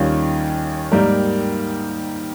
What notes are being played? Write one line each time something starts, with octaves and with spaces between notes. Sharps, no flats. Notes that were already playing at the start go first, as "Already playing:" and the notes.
Already playing: D#2 D#3 G3 C#4 F4
G#2 G3 A#3 D#4 A#4